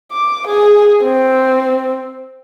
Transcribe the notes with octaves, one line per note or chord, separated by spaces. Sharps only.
D6
G#4
C4